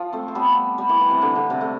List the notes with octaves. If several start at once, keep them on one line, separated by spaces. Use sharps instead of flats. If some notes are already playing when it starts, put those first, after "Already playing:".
Already playing: F3
A3 C4
C4
G3 B3
G3
E3
E3
C3
D3
D3
C3
A3